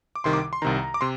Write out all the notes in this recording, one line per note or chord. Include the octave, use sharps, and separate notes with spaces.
D6
C2 C3 D#3 C6
D6
C6
C2 C3 D#3 A#5
D6
C3 C6